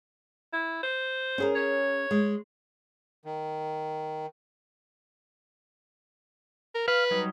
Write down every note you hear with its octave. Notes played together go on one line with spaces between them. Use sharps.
E4
C5
C#4 G#4 A#4
C#5
G#3
D#3
A#4
B4 F5
F#3 G3 D#4